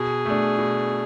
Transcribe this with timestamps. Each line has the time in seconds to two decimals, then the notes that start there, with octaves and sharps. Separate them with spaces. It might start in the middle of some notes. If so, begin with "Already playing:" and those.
Already playing: B2 G#4
0.25 A3 D4
0.58 B2